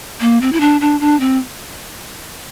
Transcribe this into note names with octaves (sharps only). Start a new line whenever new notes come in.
A#3
C4
E4
D4
D4
D4
C4